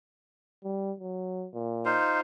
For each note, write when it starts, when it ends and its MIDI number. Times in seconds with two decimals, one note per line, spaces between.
0.64 0.92 55
1.00 1.47 54
1.54 1.96 46
1.85 2.21 63
1.85 2.21 65
1.85 2.21 72